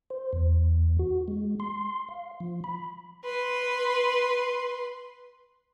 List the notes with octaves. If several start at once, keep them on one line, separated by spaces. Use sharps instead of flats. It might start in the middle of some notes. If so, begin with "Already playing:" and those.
C5
E2
F#4
G#3
C6
F5
F3
B5
B4 C6